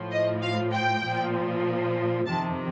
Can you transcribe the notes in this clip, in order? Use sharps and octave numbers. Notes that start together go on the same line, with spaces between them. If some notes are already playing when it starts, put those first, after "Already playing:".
Already playing: A2 F3
D#5
F5
G5
A#2 F3
F2 C3 D#3 A5